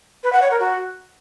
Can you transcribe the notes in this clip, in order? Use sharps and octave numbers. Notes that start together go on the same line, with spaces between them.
B4
F#5
C#5
A#4
F#4